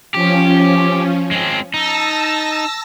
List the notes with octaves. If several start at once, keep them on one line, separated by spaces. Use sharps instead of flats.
F3 C#4 G4
G#3 C4
D#4 A5 E6 A#6